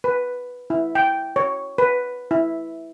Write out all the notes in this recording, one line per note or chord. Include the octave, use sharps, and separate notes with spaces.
B4
E4
G5
C#5
B4
E4